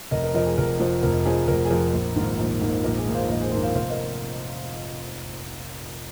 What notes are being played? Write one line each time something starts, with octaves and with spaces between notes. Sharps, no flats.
F1 A#4 D#5
A#4 D#5
F2 F3 A#4 D#5
G#4
F1 A#4
F2 F3
F1 A#4
F2 F3 G#4
F1 A#4
G#4
F2 F3 A#4
A#1
G#2 D#3 A#3
A#1
G#2 D#3 A#3
A#1 A#4
G#4
G#2 D#3 A#3
C5 F5
A#1 A#4 D#5
G#4 C5
G#2 D#3 A#3 G#4 C5
C5 F5
F1 C5 F5
A#4 D#5